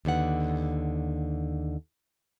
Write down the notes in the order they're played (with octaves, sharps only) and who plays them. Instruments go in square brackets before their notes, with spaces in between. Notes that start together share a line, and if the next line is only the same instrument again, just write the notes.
[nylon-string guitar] D#2 D3 B4 F#5